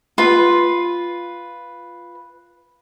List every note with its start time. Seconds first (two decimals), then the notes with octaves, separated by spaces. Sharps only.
0.18 F4 B4